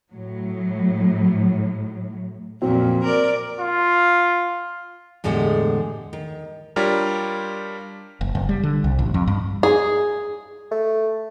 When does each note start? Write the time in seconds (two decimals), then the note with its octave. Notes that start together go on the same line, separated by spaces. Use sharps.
0.10 A2 F#3
2.62 F2 A#2 F#3 C4
3.04 A#4 D5
3.60 F4
5.24 E2 A2 D3 G#3 G4 F#5
6.13 D#3
6.76 G3 D4 F4 G4 A#4 C#5
8.21 F#1
8.35 F#1
8.49 G3
8.63 D3
8.84 C2
8.99 A1
9.14 F2
9.27 G2
9.63 G#4
10.71 A3